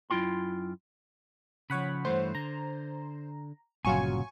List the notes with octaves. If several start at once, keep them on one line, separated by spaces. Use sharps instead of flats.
F#2 E4 F4 G5 C6
C#3 F3 C#5 F#5 B5
G2 E3 A3 C5
D3 A#5
G1 A#2 C#3 F#3 F4 G#5 C#6